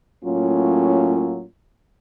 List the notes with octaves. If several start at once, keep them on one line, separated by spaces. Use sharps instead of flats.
A2 F#3 A#3 C#4 F4